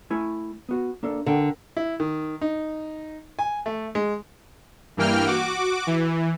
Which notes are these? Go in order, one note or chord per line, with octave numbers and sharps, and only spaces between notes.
A3 E4 G#5
B3 F#4
A#3 D4 A4
D3 A#4 F#5 G5
E4
D#3
D#4
G#5
A3
G#3
G2 E3 A#3 G5 F6
F#4 D6
E3